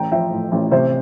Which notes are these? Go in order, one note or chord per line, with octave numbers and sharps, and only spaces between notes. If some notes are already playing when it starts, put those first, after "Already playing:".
Already playing: A1 G5 A#5
F3 E5 G5
A2
A1
C3 C5 E5